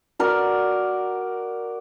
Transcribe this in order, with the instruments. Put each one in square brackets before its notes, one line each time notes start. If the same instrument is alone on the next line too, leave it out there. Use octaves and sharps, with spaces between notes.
[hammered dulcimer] F#4 A#4 D5